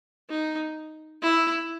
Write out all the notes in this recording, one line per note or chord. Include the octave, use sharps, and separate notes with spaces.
D#4
E4